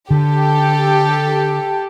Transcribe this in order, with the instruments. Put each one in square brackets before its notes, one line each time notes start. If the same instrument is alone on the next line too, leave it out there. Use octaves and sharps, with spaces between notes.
[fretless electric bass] D3 [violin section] G4 A4